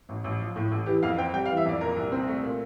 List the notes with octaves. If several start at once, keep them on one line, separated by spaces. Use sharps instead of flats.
A1
A1
F3
A2
A1
E3 G4
F2 F5
C4 G5
G3 G5
F5
E3
E5
F2 D5
A#2 A#4
C2
C4
A3
A#2